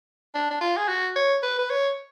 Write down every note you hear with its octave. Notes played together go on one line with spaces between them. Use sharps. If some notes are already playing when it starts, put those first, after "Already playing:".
D4
D4
F4
G#4
F#4
C#5
B4
B4
C#5